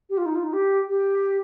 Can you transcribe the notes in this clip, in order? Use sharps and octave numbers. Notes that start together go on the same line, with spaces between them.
G4
F4
D#4
F4
D#4
G4
G4